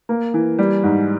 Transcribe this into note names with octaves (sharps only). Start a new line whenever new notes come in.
A#3
E3
G3
G#2